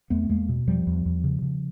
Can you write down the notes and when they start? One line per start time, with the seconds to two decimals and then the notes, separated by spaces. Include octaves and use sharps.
0.10 E2 A3 B3
0.23 B3
0.29 E2 G#3 A#3
0.49 B2
0.67 E2 F3 G3
0.87 E2
1.06 E2
1.24 C#3
1.42 C#3